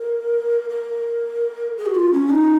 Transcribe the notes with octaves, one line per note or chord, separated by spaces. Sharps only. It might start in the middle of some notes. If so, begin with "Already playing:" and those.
Already playing: A#4
A#4
G#4
F#4
F4
C#4
D#4